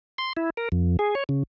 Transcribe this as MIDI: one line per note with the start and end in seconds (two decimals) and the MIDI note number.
0.18 0.33 84
0.37 0.50 64
0.57 0.69 70
0.72 0.97 41
0.99 1.15 68
1.15 1.24 73
1.29 1.43 49